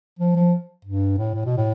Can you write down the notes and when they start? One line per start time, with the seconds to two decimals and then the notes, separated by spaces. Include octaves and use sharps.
0.19 F3
0.36 F3
0.85 G2
1.18 A2
1.34 A2
1.46 B2
1.57 A2